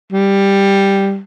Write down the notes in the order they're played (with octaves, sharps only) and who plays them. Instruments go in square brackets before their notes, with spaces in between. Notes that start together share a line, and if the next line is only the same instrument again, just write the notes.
[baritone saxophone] G3